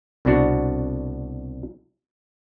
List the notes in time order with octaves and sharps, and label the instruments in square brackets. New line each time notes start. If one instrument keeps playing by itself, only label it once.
[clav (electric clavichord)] C2 B2 B3 D4 F#4